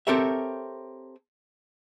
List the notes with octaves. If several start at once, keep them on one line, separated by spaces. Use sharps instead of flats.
C4 G4 A4 A#4 C#5 E5